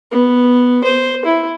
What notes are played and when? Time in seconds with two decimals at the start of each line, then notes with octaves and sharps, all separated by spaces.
0.12 B3
0.84 C5
1.25 E4